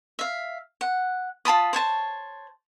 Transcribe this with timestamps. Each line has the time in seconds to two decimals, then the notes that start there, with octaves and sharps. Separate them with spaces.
0.19 E5 F5
0.81 F#5
1.45 F4 A5 B5 D#6
1.73 C5 C#5 A5